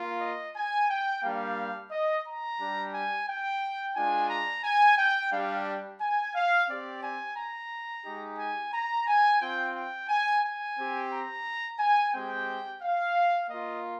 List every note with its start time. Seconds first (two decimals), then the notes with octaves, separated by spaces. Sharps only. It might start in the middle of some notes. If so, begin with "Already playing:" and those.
Already playing: A#3 F4
0.20 D#5
0.55 G#5
0.89 G5
1.23 G3 A#3 D4 G4 F5
1.91 D#5
2.25 A#5
2.59 G3 D4 G4
2.93 G#5
3.27 G5
3.95 G#3 D4 F4 G#5
4.30 A#5
4.64 G#5
4.98 G5
5.31 G3 D4 G4 F5
6.00 G#5
6.34 F5
6.68 C4 G4 D5
7.02 G#5
7.36 A#5
8.05 G#3 D#4 G4
8.38 G#5
8.73 A#5
9.07 G#5
9.40 C4 F4 G5
9.75 G5
10.09 G#5
10.43 G#5
10.77 C4 G4
11.11 A#5
11.79 G#5
12.13 G#3 C4 G4 G5
12.82 F5
13.49 A#3 F4 D#5